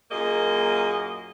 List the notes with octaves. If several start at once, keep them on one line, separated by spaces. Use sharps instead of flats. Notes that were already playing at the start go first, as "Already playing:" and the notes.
F#2 A#2 A#3 G#4 D#5